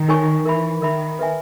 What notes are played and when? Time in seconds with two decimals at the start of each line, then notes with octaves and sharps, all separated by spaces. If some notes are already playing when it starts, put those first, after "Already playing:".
Already playing: D#3
0.08 D#4 A#4 C#5 G#5 C#6
0.45 E3 A#4 E5 B5
0.82 D#3 A#4 E5 B5
1.19 B4 E5 G#5